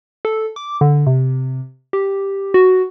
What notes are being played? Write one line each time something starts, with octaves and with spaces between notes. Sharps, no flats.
A4
D6
D3
C3
G4
F#4